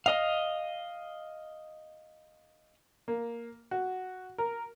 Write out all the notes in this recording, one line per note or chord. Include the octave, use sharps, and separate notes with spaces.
D#5 F5
A#3
F#4
A#4